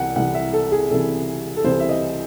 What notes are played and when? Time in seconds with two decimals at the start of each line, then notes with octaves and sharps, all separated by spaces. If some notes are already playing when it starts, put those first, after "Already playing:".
Already playing: C2 C3 E3 F#5
0.16 C2 C3 E3 F#5
0.35 E5
0.53 A4
0.72 G#4
0.91 C2 C3 E3 A4
1.56 A4
1.64 C2 C3 E3 C5
1.80 E5
1.89 D#5